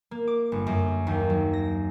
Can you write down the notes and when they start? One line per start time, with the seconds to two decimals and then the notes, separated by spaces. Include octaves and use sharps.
0.11 A#3
0.27 D6
0.52 G1
0.67 F#2
1.07 D#2
1.30 F#3
1.53 A#6